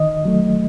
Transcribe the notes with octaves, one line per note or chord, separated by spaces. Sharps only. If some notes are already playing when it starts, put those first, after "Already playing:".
Already playing: D#3 D#5
F#3 A3